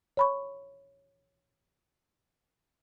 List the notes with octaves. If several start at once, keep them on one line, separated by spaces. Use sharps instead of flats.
C#5 B5 C#6